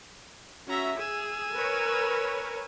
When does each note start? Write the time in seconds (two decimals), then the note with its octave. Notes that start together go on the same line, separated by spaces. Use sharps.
0.67 C#4 F#4 E5 A#5
0.98 G#4 G#5 E6
1.54 A#4 B4 C#5